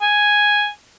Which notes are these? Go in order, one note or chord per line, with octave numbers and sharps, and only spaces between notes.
G#5